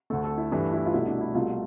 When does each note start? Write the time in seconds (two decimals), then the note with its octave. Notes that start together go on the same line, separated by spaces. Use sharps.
0.10 D2 D3 A3 A4
0.24 A4
0.38 E4
0.52 G2 E3 A3 E4
0.73 E4
0.86 F4
0.94 C2 B2 A3 E4
1.07 D4
1.21 E4
1.35 C2 B2 A3 F4